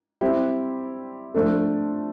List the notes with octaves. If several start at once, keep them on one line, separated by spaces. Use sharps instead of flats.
G3 C4 E4 G4
F3 A3 D4 A4